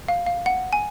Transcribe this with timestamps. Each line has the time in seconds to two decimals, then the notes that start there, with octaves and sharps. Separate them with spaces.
0.08 F5
0.27 F5
0.46 F#5
0.73 G#5